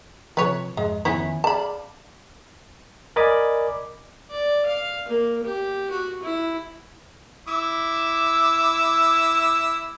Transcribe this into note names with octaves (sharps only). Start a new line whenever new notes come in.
C3 F3 B4 C#5
F2 G#2 G#3
F2 D#3 F3 B3 C#4 E4
G#4 D5 F5 A5 B5
A#4 D5 D#5 G#5 B5 D6
D5
F5
A#3
G4
F#4
E4
E4 D6 E6